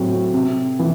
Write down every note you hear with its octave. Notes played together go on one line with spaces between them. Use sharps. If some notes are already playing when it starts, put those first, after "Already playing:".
Already playing: A2 F#3 C4 F#4
C3
E3